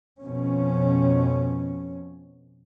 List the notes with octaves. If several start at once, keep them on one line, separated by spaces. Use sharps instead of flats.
F2 B2 C#4